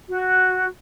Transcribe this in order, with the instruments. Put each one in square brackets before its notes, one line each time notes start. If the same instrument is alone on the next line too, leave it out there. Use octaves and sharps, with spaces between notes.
[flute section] F#4